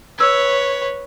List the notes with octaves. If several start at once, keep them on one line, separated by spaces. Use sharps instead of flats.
B4 C#5 E6 G#6